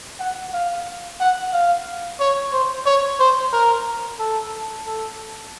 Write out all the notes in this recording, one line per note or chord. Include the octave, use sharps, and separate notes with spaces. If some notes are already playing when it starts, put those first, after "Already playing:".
F#5
F5
F#5
F5
C#5
C5
C#5
C5
A#4
A4
A4